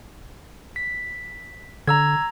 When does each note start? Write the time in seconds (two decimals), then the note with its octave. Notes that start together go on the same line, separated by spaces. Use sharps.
0.76 B6
1.87 D3 A#5 E6 G#6